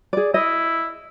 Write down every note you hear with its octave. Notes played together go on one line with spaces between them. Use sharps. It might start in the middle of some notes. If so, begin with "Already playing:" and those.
G#4 D5
E4 D#5